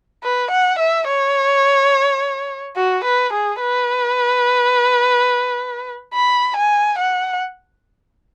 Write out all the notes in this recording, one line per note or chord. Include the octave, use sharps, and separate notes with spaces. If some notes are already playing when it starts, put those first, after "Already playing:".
B4
F#5
E5
C#5
F#4
B4
G#4
B4
B5
G#5
F#5